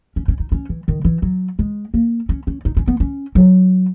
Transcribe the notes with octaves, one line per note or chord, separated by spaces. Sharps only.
C#4
C#4
D#4
C#4
E3
D#3
E3
F#3
G#3
A#3
C#4
C#4
D#4
C#4
B3
C#4
F#3